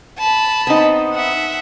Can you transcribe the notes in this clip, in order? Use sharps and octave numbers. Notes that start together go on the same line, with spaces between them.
A5 B5
B3 C4 D#4
E5 F#5